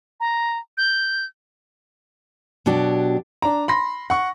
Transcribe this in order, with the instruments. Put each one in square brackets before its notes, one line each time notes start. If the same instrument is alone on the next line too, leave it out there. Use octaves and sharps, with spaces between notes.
[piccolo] A#5
G6
[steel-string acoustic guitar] B2 F#3 D4 G4
[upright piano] D4 A#5
B5 C6 A#6
F#5 C#6